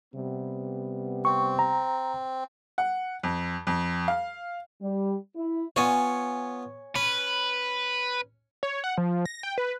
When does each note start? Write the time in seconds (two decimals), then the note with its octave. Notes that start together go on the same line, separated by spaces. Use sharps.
0.14 C3 G3 B3
1.25 C4 C#6
1.59 A#5
2.78 F#5
3.23 F2
3.67 F2
4.08 F5
4.80 G3
5.35 E4
5.76 B3 F4 C#5 G#5
6.96 C#4 B4
8.63 C#5
8.84 F#5
8.98 F3
9.26 A#6
9.43 G5
9.58 B4